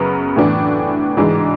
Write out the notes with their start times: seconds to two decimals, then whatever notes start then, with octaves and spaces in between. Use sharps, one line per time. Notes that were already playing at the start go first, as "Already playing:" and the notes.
Already playing: F#2 C#3 F#3 B3
0.36 A2 E3 B3 D4
1.17 G#2 E3 G#3 D4